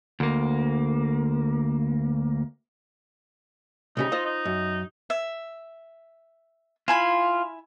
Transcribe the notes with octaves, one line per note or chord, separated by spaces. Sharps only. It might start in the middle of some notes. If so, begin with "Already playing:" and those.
D2 A#3
C2 C#3 D#4 G4
F4 C5 D#5
D#4
F#2
E5
E4 F4 G#5 B5